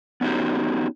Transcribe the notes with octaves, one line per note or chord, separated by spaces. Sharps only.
B3 C#4 D#4 F#4 G4